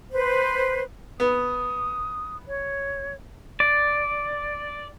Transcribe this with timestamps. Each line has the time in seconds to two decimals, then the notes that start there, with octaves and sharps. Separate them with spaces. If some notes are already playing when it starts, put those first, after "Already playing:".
0.11 B4 C5
1.20 B3 D#6
2.47 C#5
3.60 D5